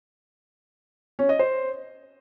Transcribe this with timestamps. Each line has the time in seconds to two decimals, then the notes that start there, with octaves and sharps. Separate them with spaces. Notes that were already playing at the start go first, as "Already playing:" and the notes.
1.19 C#4
1.29 D#5
1.39 C5